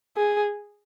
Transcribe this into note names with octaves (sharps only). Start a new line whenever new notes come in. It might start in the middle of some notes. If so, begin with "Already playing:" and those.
G#4